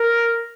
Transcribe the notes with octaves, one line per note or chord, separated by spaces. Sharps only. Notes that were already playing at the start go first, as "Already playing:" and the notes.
Already playing: A#4